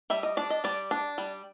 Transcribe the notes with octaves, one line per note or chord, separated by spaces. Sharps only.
G3 E5
D#5
D4 D5
D#5
G3 D5
D4
G3